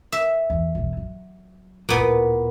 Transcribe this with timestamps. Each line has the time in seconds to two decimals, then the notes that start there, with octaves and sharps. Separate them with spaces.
0.12 E5
0.50 E2
0.75 E1 E2
0.97 F#3
1.89 D1 A#2 B3 E4